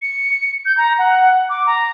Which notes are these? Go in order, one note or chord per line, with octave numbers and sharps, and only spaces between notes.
C#7
G6
A#5
F#5
D6
A#5